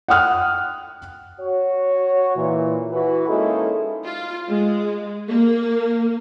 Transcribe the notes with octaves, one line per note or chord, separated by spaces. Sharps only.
F#5 G5 D#6 F6 F#6
F#4 C#5
A#2 E3
E3 F#4 B4
G#3 A#3 C#4 D#4 E4 A4
F4
G#3
A#3